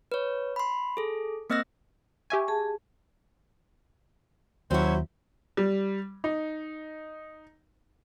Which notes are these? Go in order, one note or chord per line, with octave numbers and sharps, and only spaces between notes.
B4 C#5
B5 C6
G#4 A4
A#3 C4 D#5 E6 F#6 A#6
G4 E5 G#5 C#6
G#4 A5
D#2 F#3 C#4 E4 F#4 C5
G3
D#4